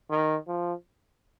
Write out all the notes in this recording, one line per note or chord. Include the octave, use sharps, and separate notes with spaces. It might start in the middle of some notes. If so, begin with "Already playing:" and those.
D#3
F3